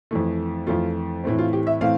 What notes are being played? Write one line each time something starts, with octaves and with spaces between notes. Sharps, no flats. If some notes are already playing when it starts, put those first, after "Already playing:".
F2 E3 A3
F2 E3 A3 F4
A2 E3 A3 C4
F4
G4
E5
A2 E3 A3 C4 F5